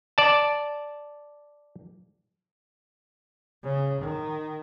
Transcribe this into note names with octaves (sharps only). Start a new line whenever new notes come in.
D5 A5
C#3
D#3